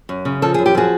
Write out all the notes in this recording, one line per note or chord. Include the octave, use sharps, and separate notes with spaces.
F#2
C#3
F3 A4
F#2 G#4
G4
F3 F#4 G#4